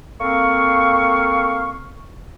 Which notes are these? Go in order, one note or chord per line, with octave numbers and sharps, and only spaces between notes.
A#3 C4 A4 F5 C#6